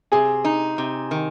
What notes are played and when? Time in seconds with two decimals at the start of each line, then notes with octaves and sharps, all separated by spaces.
0.12 C3 G#4
0.45 D#4
0.78 C3
1.11 D#3